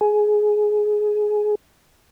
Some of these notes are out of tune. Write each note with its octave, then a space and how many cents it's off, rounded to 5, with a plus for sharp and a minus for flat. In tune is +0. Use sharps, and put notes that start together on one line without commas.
G#4 +15